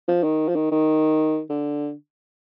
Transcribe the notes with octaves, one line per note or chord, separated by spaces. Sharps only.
F3
D#3
F3
D#3
D#3
D3